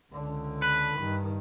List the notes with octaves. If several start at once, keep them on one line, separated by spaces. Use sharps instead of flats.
C#2 D3
B4
G2 D#3